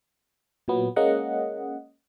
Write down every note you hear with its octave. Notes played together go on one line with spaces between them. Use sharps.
A#2 F#3 B3
G#3 A#3 C#4 D#5 F#5